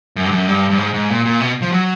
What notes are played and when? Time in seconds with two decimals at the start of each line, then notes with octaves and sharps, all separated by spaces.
0.16 F#2
0.25 G2
0.31 F#2
0.48 G2
0.70 G2
0.78 G#2
0.94 G#2
1.10 A#2
1.25 A#2
1.41 B2
1.62 F3
1.72 F#3